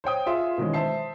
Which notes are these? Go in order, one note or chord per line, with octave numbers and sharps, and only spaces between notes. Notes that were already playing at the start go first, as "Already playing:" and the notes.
C5 C#5 G5 D#6
F4 G#4 E5 C6
B2 D#3 E3 G#3 C#4
C5 E5 A5 C7